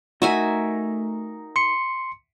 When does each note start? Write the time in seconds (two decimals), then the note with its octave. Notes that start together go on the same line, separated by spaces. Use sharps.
0.22 A3 D#4 F#4 A#4 E5 G#5
1.56 C6 C#7